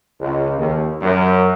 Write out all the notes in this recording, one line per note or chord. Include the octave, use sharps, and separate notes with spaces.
C#2
D#2
F#2